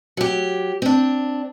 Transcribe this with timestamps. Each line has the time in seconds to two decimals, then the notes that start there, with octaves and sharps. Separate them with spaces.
0.17 F#3 G4
0.82 C4 D4